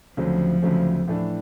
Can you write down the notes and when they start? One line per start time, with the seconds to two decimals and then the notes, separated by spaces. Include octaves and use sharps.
0.17 D2 C#3 F3 F#3 A3 C4
0.62 D2 C#3 F#3 A3 C4
1.07 A2 E3 A3 D4